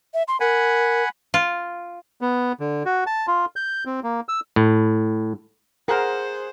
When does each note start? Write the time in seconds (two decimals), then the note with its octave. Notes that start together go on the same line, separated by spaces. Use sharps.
0.14 E5
0.28 C6
0.40 A#4 F#5 G#5 B5
1.34 F4
2.21 B3
2.60 D3
2.86 F#4
3.07 A5
3.27 F4
3.56 G6
3.86 C4
4.03 A#3
4.29 E6
4.56 A2
5.88 G#4 A#4 C5 F#5